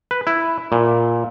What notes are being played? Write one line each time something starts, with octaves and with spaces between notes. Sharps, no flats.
B4
E4
A#2